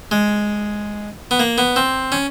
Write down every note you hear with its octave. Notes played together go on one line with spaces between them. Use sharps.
G#3
B3
A#3
B3
C4
C#4